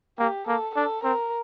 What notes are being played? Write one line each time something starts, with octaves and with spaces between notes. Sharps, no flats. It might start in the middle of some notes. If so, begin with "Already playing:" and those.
A#3 G4
A#3 A4
D4 A4
C4 A#4